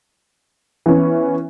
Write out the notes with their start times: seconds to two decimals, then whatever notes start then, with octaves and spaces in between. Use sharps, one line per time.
0.86 E3 B3 C#4